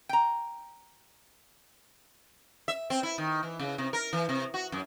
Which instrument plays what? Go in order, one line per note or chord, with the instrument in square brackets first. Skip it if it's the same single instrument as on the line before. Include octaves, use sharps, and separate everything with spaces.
[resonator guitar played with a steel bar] G5 A#5
[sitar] E5
C4
E4
D#3
E3
C#3
C3
A#4
E3
C3
F#4
F#2